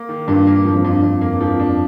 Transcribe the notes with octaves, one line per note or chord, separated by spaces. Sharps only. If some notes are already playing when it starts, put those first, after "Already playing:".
Already playing: A#3
D#3
G2 A#2
A#3
G2 F3
F2
G2 A#2
F2 A#2
A#3
G2
F3
F2
D4